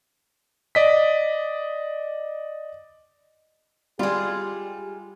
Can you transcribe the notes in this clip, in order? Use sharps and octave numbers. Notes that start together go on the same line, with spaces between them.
D5 D#5 B6
G3 G#3 F4 G4